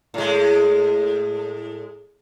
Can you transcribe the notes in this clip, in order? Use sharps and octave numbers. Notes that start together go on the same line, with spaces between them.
A2 G#3